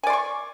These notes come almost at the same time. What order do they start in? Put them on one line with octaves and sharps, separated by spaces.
G#5 D5 C6 C#6